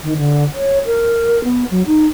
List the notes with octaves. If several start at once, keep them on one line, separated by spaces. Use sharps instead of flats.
D#3
D3
C#5
A#4
B3
F#3
D#4